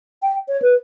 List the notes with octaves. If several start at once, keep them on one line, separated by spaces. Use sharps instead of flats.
G5
C#5
B4